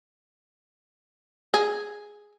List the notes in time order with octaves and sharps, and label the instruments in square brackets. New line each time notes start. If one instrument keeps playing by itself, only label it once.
[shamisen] G#4